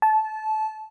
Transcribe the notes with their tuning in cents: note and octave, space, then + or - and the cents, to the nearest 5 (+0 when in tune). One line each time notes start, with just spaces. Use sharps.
A5 -20